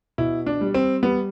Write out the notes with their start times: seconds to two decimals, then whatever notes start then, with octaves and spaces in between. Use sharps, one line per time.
0.18 B2 E4
0.46 D4
0.61 G3
0.74 C4
1.03 G3 B3